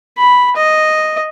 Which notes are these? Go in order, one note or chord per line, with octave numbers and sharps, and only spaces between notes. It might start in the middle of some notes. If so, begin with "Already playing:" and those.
B5
D#5